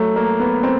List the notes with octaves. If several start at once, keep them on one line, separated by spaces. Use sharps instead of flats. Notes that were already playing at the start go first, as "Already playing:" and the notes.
Already playing: F#3 A3
A#3
B3
C4